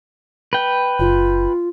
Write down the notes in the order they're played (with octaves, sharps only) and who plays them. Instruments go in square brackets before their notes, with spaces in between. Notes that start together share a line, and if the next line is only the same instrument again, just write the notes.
[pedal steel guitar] B4 G5
[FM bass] F#1 [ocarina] F4